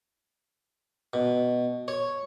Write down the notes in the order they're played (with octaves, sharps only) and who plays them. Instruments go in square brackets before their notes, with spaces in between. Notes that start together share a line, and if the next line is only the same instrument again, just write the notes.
[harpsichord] B2
C#5